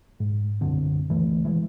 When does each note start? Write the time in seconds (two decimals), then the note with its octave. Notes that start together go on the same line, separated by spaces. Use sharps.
0.20 G#2
0.61 B1 F#2 D3 C4
1.10 C#2 E3 A3
1.45 E3 G#3